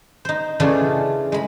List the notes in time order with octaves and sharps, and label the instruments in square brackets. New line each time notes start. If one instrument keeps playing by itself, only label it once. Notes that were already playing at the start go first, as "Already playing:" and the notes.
[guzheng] D#4 C5
C#3 E3 A3 D4 F4 G#4
G#3 B5